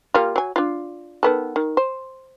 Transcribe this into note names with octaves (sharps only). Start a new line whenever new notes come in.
G3 A#3 F4
F#3 G#5
D4 F4
D#3 B3 A4
D#3
C5